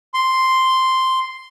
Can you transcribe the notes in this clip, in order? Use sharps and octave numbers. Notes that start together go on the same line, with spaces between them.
C6